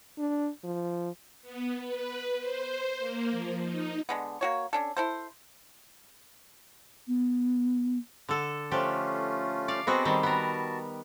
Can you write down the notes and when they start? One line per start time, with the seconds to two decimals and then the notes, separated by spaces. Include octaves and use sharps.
0.18 D4
0.64 F3
1.42 B3
1.79 B4
2.38 C5
2.99 A#3
3.31 F3
3.61 D#4
4.09 D3 G#3 B3
4.41 A#3 F#4 C#5
4.73 C#4 D4 A4
4.97 E4 A4 C5
7.08 B3
8.29 D3 A4
8.71 F3 A3 C#4 D4 F4 G4
9.68 D5 F5
9.87 B3 C4 F#4 G#4 A4 D#5
10.05 D#3 G3 C4
10.23 B3 F#4 A#4 A5